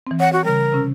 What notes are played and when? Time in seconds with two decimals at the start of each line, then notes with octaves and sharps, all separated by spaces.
0.07 E3 C4
0.20 C#5 F#5
0.33 F#4
0.45 C#3 G3 A#4
0.72 C3 C#4 E6